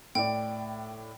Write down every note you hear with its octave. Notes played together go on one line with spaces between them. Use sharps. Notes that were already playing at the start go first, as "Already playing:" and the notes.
A2 D5 G5